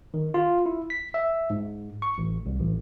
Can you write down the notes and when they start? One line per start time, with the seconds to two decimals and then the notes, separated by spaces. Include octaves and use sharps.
0.14 D#3
0.34 F4
0.66 E4
0.90 B6
1.14 E5
1.50 G#2
2.02 C#6
2.18 A1
2.46 C2
2.60 A1